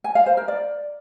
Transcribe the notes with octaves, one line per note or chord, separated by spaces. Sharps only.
G#5
F5
C5
A#4
D5